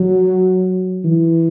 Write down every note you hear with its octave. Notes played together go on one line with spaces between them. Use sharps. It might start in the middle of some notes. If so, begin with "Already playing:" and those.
Already playing: F#3
E3